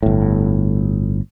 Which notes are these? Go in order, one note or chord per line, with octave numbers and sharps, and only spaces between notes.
G1 A2